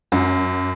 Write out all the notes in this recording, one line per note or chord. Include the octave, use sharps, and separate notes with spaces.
F#2